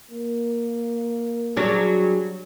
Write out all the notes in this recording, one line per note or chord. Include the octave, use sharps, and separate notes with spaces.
A#3
F#3 G3 D4 G#4